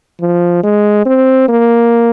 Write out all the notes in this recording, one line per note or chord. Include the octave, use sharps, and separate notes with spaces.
F3
G#3
C4
A#3